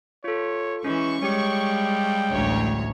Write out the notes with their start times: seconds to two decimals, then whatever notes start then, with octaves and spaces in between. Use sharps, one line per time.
0.24 F4 A4 C#5
0.84 E3 G#3 C#4 C#6
1.22 G3 G#3 G4 C#5 G5
2.31 A1 D2 C#5